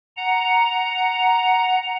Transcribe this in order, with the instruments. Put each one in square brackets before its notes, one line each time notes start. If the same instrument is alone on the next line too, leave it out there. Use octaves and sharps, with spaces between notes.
[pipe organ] F#5 A#5